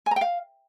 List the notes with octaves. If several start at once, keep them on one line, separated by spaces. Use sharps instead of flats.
G#5
A#5
G5
F5